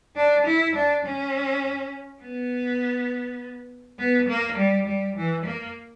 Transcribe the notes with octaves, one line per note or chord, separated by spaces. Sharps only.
D4
E4
D4
C#4
B3
B3
A#3
G3
G3
E3
A#3